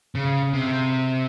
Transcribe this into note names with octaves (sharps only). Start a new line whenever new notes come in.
C#3
C3